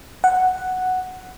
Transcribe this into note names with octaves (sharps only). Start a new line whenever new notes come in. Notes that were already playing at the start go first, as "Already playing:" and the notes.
F#5